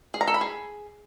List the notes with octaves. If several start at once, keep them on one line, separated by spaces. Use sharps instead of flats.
G#4
A#5
A4
B5
G#4